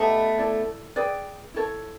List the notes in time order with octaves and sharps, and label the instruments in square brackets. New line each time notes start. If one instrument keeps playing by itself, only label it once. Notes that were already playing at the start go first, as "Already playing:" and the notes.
Already playing: [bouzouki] A3 B3 [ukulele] D#4 G4 D#5
[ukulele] E4 A4 D5
G#4 B4 D5 G5
E4 A4 C#5